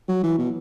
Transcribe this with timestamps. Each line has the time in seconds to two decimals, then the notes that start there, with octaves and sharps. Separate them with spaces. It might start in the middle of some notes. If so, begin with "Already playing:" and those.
0.08 F#3
0.23 E3
0.39 B2